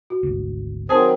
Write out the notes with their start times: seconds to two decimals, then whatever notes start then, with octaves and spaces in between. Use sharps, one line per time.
0.10 F#4
0.23 G#1 D2
0.89 D#3 F#3 C4 G#4 C5 A5